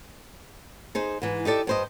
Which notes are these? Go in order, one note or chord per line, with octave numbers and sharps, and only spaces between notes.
D#4 G#4 C5
G#2 E3
D#4 G4 A4 D5
G2 C5 D#5